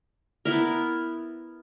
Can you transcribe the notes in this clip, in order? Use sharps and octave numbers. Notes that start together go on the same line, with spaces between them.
B3 E4 A#4